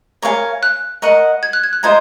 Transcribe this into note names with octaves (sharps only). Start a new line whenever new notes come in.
A#4 C#5 F5 G#5
F#6
A#4 D#5 F#5 C#6
G#6
F#6
G#6
F#6
F4 C5 D#5 A#5 G#6